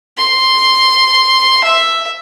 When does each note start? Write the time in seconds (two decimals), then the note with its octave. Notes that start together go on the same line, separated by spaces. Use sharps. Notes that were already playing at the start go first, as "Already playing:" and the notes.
0.17 C6
1.64 E5